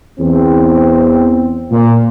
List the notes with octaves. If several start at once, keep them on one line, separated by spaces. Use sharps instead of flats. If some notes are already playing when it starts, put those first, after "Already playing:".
E2 C4
A#2